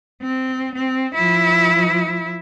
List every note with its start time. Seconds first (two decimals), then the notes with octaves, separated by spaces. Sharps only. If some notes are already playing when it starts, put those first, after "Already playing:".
0.22 C4
0.75 C4
1.14 F3 E4